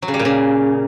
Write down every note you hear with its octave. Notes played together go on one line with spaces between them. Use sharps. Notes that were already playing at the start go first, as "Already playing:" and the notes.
F#3
C#3
G3
A#2
C#3